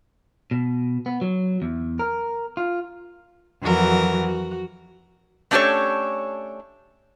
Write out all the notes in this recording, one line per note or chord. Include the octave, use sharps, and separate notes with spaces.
B2
B3
F#3
E2
A#4
F4
F2 E3 F#3 F#4 A#4 F#5
F#4
A3 C#4 D4 G4 A4 C#5